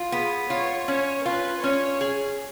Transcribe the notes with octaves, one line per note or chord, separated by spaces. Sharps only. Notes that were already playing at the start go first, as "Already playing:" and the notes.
Already playing: F4
B3 G#4
F4 C#5
C#4 C#5
F4 B4
C#4 C#5
G#4